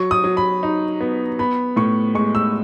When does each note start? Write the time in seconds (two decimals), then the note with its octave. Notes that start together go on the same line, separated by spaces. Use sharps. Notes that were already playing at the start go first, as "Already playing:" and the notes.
Already playing: F#3 C#6
0.11 D#6
0.24 F#3
0.37 B5
0.63 D#4
1.01 B3
1.39 B3 B5
1.76 A2 C#6
2.15 G#3 C#6
2.35 E6